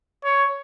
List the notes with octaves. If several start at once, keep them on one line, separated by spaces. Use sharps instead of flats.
C#5